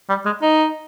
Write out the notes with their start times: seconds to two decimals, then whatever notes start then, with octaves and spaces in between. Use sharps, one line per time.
0.09 G3
0.25 G#3
0.42 D#4